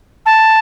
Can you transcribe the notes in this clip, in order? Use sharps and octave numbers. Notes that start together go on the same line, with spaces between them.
A5